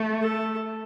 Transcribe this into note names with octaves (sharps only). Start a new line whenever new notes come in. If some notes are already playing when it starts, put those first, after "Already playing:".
Already playing: A3
A4